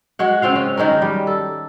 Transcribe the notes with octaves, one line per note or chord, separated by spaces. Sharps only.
G#3 F#4 F#5
C#3 C4 F4 F5
C#4
D#3 G#3 C#4 A#4
G3
A4